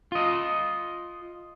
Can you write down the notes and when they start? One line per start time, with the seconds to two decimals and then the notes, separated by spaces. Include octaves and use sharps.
0.12 F4 D#5